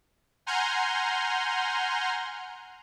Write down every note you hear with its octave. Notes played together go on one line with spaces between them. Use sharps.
F#5 G#5 A#5 C6 F6 G6